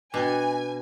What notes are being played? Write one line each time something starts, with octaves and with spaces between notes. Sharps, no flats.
B2 D4 F#4 G5 G#5